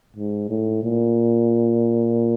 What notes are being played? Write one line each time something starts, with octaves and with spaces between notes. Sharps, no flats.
G#2
A2
A#2